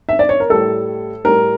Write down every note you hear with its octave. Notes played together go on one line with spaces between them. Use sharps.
E5
D5
C#5
A#4
A2 G3 A4
A2 G3 A#4